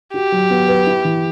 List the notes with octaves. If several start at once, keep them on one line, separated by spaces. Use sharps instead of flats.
F#4 G4
F#3
B3
B4
E4
E3